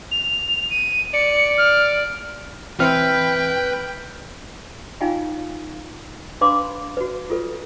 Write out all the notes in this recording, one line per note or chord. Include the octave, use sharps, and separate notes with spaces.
F7
D#7
D5 C#7
F6
E3 C4 B4 E5 G5 F6
D#4 F4 F5 G5 G#5
D4 B4 F5 B5 C6 D6
F#4 B4
F4 A4 B4